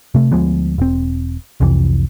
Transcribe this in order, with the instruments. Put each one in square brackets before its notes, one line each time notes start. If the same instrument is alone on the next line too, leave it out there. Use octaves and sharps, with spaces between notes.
[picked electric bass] C3 A3
D2 F3 G#3 B3
E1 C4
C2 F2 C3 E3